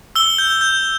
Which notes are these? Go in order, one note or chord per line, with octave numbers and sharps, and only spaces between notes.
E6 G7
G6
G6